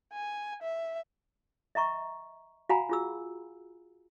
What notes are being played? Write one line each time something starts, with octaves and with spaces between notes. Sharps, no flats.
G#5
E5
D#5 E5 A#5 C#6
F#4 F5 F#5 G#5 A#5 B5
F4 G#4 E6